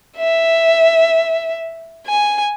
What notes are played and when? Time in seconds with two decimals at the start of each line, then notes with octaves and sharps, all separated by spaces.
0.18 E5
2.07 G#5